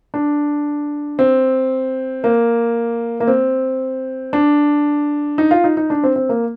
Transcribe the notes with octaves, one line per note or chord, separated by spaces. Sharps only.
D4
C4
A#3
A#3
C4
D4
D#4
F4
D#4
D#4
D4
C4
C4
A#3